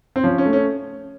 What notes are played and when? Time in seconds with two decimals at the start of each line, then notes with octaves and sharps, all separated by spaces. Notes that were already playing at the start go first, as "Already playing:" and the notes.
0.16 C4
0.23 F3 C#4
0.38 C#4
0.46 A3
0.53 C#4